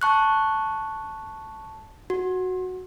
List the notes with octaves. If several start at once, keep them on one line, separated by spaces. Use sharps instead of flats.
A5 C#6 F#6
F#4